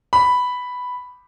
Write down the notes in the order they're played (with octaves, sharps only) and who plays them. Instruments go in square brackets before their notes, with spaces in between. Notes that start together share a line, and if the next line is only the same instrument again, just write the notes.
[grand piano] B5